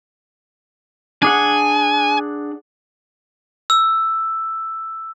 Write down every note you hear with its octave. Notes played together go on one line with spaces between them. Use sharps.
D4 G#4 F#5 G#5
E6